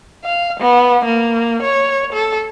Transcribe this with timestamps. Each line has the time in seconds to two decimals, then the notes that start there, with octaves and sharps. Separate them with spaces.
0.25 F5
0.61 B3
1.05 A#3
1.63 C#5
2.13 A4